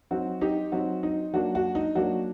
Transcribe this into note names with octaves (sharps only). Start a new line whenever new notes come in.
F#3 C4 D#4 F#4
D#4 G4
F#3 C4 D#4 F#4
D#4
F#3 A#3 D4 F#4
F#4
D#4
F#3 A#3 D4 F#4